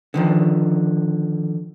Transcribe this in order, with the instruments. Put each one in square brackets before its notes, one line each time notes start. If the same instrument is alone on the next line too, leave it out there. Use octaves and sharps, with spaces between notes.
[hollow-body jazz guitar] D3 D#3 F3